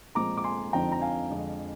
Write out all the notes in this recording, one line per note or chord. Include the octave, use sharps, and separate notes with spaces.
A#2 F3 G#3 C4 A#5 D6
D6
G#5 C6
F2 D3 F3 C4 D#4 G5 A#5
A#5
F5 G#5
F2 D3 G#3